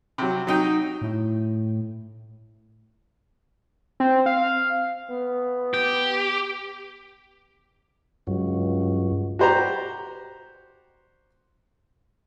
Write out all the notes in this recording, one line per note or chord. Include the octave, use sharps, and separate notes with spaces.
C3 F#3
F#3 D#4 G5
A2
C4
F5
B3
G4
C#2 G2 F#3
F#4 G4 C5 D5 A#5